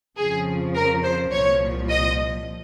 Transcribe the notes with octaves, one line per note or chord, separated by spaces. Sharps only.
F2 C#3 F3 G#4
A#4
C5
C2 A#2 F3 C#5
D#5